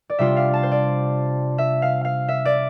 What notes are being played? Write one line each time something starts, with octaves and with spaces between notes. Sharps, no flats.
D5
C3 G3 D4 F4 E5
F5
A5
C5
D5
E5
F5
F5
E5
D5